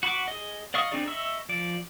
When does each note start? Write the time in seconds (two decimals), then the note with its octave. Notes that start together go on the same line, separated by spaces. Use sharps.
0.03 F#4 B5 C#6 D6
0.28 G#4 D#5
0.74 D5 D#5 F5 C#6 D#6
0.91 C4 D4 D#4 G#4 D5
1.08 D#5 E5 B5 C#6 E6
1.49 F3 D5